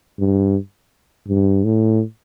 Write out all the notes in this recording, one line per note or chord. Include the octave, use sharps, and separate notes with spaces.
G2
G2
A2